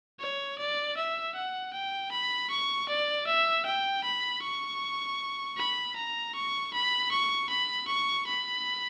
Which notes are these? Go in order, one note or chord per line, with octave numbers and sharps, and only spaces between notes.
C#5
D5
E5
F#5
G5
B5
C#6
D5
E5
G5
B5
C#6
B5
A#5
C#6
B5
C#6
B5
C#6
B5